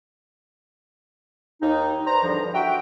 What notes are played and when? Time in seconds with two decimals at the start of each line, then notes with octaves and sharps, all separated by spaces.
1.62 D#2 D#4
2.07 B4 C5 D5 A#5
2.23 E2 G2 D3 F3
2.54 F#4 E5 G5